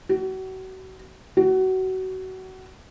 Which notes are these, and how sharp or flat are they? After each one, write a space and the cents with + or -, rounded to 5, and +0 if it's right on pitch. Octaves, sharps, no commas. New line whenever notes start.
F#4 +35
F#4 +25